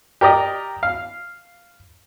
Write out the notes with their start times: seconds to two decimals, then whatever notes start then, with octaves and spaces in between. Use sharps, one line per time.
0.21 G4 A#4 D5 D#5
0.83 F5